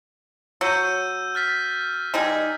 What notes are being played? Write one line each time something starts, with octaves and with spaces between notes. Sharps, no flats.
F#3 E6 G6 D#7
F6 A6 B6
G3 D#4 G#4